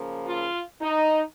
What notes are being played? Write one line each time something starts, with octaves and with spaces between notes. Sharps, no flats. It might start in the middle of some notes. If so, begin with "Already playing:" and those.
Already playing: C#3 F3 A#3
F4
D#4